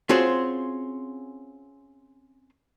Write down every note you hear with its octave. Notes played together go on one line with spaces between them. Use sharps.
C4 C#4 F4 F#4 G#4 C5